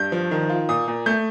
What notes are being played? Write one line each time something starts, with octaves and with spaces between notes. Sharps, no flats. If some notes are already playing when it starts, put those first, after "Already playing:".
Already playing: G2 G6
F3
D#3
F4
A#2 D#6
A#2
A3 G6